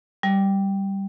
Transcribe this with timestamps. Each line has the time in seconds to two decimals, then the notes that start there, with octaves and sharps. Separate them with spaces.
0.23 G3